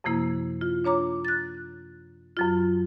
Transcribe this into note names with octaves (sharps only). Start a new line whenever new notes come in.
F#2 C3 F3 A#3 E4
F4
D4 C#5 A#5 D6
F#6 A6
F#2 F#3 F4